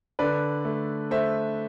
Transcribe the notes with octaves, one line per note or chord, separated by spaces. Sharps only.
D3 B4 D5
A3
A3 C5 E5